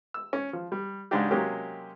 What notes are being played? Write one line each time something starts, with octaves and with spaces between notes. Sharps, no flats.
E6
C#4
F3
G3
G#2 C#3 G#3 D4 D#4 G4
C3 F#3 G#3 A#3 C#4 G4